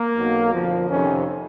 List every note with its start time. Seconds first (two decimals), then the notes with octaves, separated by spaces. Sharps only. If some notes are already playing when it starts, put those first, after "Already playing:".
Already playing: A#3
0.15 B1 B2 F#3
0.52 F2 D3 F3
0.90 F2 C3 D#3 C#4